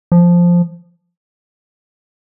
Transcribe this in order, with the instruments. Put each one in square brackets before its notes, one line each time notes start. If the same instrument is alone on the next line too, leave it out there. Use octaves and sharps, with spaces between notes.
[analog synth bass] F3